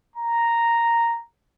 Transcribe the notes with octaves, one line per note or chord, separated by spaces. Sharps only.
A#5